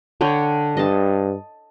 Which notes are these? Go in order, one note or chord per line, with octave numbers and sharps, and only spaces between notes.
D3 C#5 G5
G2 D#5 A5